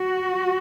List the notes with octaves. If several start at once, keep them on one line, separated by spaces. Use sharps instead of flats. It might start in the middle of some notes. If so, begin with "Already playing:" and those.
Already playing: F#4